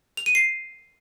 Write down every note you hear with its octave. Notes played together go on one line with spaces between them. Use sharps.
F7
D#7
C7